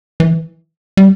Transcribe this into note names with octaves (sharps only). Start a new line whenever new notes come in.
E3
G3